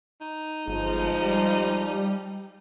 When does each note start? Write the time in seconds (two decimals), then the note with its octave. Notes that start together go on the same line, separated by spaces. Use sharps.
0.21 D#4
0.68 G1 F3 G#3
1.22 G3